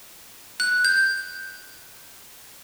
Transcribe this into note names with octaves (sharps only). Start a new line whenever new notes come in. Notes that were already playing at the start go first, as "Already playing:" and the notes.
F#6
G6